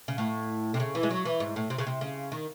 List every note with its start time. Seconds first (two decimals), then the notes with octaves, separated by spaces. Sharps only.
0.08 C#3
0.18 A2
0.74 C3
0.80 C#3
0.95 E3
1.03 G#3
1.10 F#3
1.25 E3
1.40 G#2
1.56 A2
1.70 C3
1.78 C#3
1.87 C3
2.01 C#3
2.32 D#3